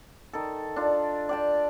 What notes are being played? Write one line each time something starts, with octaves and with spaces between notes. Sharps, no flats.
D#3 A4
D4 F4
D5 G5 A5